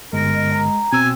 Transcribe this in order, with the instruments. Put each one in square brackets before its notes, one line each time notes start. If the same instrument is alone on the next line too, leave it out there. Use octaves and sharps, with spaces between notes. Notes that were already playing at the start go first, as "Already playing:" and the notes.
[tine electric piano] G1 [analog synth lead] G#3 [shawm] A#4
[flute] D#5
A#5
[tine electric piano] B2 E6 [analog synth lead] C4 [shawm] G#5